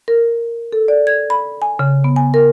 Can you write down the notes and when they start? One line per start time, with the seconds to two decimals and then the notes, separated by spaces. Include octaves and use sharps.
0.08 A#4
0.73 A4
0.88 D5
1.07 G#6
1.30 B5
1.62 G#5
1.79 C#3
2.04 B3
2.16 G#5
2.34 A#4